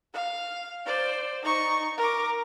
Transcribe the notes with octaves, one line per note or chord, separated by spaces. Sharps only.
F5
C5 D5
D#4 C#6
A#4 D6